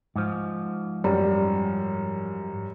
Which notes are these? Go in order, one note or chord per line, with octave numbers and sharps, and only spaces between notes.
G#2 F3
F#2 G3